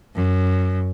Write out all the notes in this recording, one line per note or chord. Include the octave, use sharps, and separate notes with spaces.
F#2